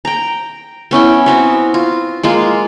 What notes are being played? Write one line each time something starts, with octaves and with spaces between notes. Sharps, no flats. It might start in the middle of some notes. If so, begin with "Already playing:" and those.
G5 A#5
B3 C#4 E4 G5
B3 C4 F#4
F4
G#3 A#3 F4